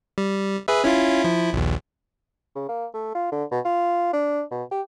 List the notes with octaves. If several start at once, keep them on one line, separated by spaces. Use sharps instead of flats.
G3
G#4 B4 E5
C#4 E4 F4
F3 E4
A#1 D#2
C#3
A#3
A3
F4
D3
B2
F4
D4
B2
G4